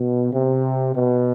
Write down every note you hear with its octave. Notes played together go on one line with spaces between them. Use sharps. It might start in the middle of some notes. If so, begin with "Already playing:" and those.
Already playing: B2
C3
B2